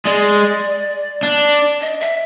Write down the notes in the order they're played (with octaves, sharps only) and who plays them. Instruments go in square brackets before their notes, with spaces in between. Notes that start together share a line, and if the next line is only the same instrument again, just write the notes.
[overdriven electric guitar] G#3 [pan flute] D5
[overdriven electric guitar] D4
[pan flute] D#5
E5